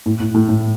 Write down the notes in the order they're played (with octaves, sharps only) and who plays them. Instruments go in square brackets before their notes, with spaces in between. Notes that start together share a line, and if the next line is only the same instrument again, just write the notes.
[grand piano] A2
A2
A2
A2